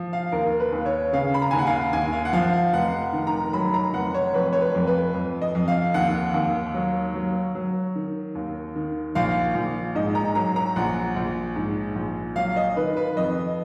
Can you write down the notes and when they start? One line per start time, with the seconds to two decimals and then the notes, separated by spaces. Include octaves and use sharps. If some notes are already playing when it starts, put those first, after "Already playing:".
Already playing: F3
0.13 F5
0.32 D#2 A#4
0.60 B4
0.72 D#2
0.86 C#5
1.13 C#3 F5
1.34 B5
1.42 A#5
1.51 D#2 G#5
1.59 F#5
1.67 F5
1.93 D#2 G#5
2.13 F5
2.25 F#5
2.33 F3 F5
2.53 F5
2.73 F1 F#5
3.13 D#3
3.27 A#5
3.53 F#3 B5
3.74 A#5
3.93 F1 F#5
4.14 C#5
4.34 F2 B4
4.53 C#5
4.61 B4
4.75 F2
4.87 B4
5.14 F2
5.42 D#5
5.55 F2
5.68 F5
5.94 D#2 F#5
6.34 D#2
6.74 F#3
7.14 F#3
7.55 F#3
7.96 D#3
8.35 D#2
8.76 D#3
9.15 A#1 F5
9.55 A#1
9.95 G#2 D#5
10.15 A#5
10.35 F#3 A#5
10.56 A#5
10.76 A#1 F#5
11.16 A#1
11.56 G#2
11.96 A#1
12.36 F#3 F5
12.56 D#5
12.77 D#3 B4
12.97 B4
13.16 F2 D#5